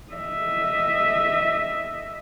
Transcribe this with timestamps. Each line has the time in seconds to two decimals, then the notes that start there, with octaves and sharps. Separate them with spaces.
0.12 D#5 E5